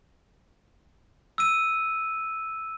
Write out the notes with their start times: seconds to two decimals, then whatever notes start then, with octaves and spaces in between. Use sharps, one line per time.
1.38 E6 D#7